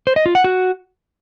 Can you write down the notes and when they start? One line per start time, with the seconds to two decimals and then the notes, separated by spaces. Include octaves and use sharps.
0.07 C5
0.16 D#5
0.26 F4
0.35 F#5
0.44 F#4